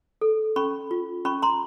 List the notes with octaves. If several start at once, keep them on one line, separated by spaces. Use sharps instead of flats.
A4
C#4 B5 C#6
F4
C#4 B5 C#6
A#5 C6